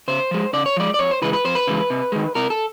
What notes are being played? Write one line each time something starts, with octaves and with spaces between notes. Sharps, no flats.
C#3 C5
F3 G#3
C#3 D5
C#5
F3 G#3 D5
D5
F2 C#5
C5
C#3 E3 G#3 B4
B4
F2 C5
B4
C#3 E3 G#3
C3
D#3 G#3
C3 A#4
A4